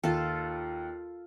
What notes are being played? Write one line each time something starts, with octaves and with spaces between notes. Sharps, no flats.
D#2 F4 A4